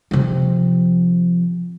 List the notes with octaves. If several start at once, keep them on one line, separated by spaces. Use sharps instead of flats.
C3 F3